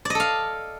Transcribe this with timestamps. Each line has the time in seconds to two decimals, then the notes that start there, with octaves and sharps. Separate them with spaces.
0.05 D5
0.10 D#5
0.15 A4
0.20 F5